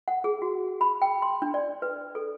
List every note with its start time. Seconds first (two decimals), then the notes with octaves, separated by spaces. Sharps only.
0.08 F#5
0.24 G#4
0.42 F#4
0.81 B5
1.02 G5
1.22 C6
1.42 D4
1.54 D5
1.82 B4
2.15 A4